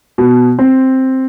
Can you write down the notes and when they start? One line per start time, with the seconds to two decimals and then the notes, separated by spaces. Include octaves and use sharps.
0.18 B2
0.59 C4